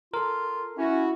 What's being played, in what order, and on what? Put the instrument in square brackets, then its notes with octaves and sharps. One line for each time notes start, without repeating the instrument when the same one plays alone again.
[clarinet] F4 [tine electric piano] A4 A#4
[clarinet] C#4 [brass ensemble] E4 F#4